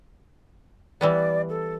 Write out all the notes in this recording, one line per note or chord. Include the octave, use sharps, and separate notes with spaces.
E3 G3 B3 D5
A4